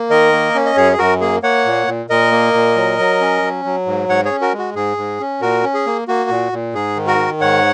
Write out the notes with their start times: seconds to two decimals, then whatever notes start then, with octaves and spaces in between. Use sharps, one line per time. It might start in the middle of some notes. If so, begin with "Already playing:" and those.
Already playing: A#3
0.10 D#3 A#4 D#5
0.32 A#3
0.55 C#4
0.66 D#5
0.77 F#2 G#4 C#5
0.92 G#4
0.98 F#2 F#4 A#4
1.21 A#3 G#4
1.43 A#3 C#5 F#5
1.65 A#2
1.87 A#2
2.10 A#2 A#4 D#5
2.32 A#3
2.53 A#2
2.76 F#3
2.99 F#3
3.21 C#4
3.42 F#3
3.65 F#3
3.86 G#2
4.09 G#2 C#5 F#5
4.25 G#4 C#5
4.31 C#4
4.41 F#4 A#4
4.53 G#3
4.58 F#4
4.75 G#2 G#4
4.97 G#2
5.20 C#4
5.41 A#2 F#4 A#4
5.64 C#4
5.74 G#4
5.86 A#3
6.08 A#3 F#4
6.30 A#2
6.52 A#2
6.74 G#2 G#4
6.96 D#3
7.07 F#4 A#4
7.18 D#3
7.41 G#2 C#5 F#5